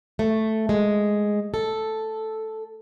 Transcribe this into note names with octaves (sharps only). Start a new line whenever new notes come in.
A3
G#3
A4